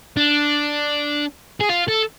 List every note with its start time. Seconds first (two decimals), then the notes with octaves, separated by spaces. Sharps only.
0.17 D4
1.61 G#4
1.70 F4
1.89 A4